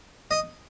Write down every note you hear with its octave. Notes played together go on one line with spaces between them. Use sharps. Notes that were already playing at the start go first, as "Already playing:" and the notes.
D#5